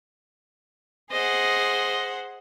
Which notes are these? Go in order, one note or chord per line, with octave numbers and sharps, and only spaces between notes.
G#4 C5 D#5 F#5